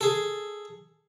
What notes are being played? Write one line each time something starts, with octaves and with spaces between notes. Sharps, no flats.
G#4 A4